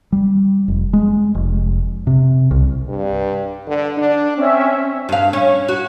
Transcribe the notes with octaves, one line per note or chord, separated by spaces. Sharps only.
G3
F1
G#3
F1
C3
C2
G2
D3
D4
C4 C#4 E5
G2 F5
C#4
F#4